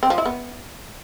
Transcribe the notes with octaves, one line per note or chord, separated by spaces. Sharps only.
C4
F3
E4
B3